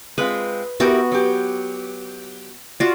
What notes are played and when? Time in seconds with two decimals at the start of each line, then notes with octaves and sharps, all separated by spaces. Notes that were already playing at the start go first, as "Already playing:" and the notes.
0.18 G#3 C4 F4 B4
0.80 B3 E4 F#4 G4 A#4 C#6
1.12 F#3 G4
2.80 F4 F#4 D5